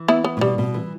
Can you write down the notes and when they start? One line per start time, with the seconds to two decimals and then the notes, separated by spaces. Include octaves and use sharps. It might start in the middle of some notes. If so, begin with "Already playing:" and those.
Already playing: E3
0.08 B3 E4
0.24 B3
0.37 A2
0.41 B2 G3
0.58 B2
0.74 E3